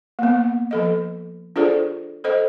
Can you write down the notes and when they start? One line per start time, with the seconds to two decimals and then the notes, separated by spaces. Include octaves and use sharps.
0.19 A#3 B3
0.71 F3 A4 D#5
1.56 D4 F4 G#4 A4 C5 D5
2.24 A4 C5 D#5